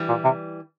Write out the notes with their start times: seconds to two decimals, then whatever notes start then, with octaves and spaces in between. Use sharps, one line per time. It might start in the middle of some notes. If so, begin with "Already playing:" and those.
Already playing: E3 G3
0.09 A#2
0.24 C3